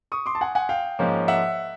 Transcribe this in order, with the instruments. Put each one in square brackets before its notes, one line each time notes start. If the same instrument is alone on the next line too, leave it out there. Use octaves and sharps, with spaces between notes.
[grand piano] C#6 D#6
C6 D6
A5
F#5 G#5
F#5 G#5
F5 G5
G#2 F3 A#3 C#4
E5 F#5